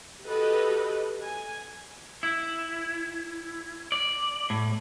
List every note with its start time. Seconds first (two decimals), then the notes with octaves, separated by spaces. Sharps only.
0.23 F#4 G4 A4 B4 D#5
1.22 G#5
2.23 E4
3.92 D5
4.50 A2